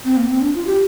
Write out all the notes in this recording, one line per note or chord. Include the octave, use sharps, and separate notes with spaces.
C4
A#3
C4
D4
F4
G4